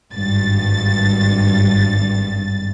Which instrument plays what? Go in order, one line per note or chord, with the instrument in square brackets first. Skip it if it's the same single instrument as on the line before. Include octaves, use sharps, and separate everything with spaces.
[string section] G#1 G2 A6